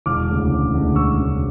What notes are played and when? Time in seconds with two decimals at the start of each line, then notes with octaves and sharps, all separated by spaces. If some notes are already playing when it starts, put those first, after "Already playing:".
0.06 E1 D6 F6
0.29 D2 C#3
0.50 E1
0.74 D2 C#3
0.95 E1 C#6 E6
1.17 D2 C#3